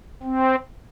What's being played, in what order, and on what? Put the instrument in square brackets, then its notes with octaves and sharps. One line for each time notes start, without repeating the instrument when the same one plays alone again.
[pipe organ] C4